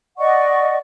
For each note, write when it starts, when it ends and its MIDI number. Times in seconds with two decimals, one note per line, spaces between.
0.18 0.76 74
0.18 0.76 75
0.18 0.76 78
0.18 0.76 85